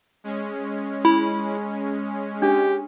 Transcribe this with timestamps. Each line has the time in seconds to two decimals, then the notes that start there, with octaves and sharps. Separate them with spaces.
0.24 G#3 C#4
1.05 E4 B5
2.42 D4 G4